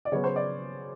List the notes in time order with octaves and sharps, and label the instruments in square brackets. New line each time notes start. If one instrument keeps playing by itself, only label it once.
[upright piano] D5
C#3 F#3 B3 C#5
C5
D5